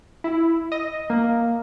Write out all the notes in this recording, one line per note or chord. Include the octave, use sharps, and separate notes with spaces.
E4
D#5
A#3